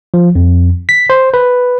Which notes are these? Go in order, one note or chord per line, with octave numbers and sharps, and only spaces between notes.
F3
F2
B6
C5
B4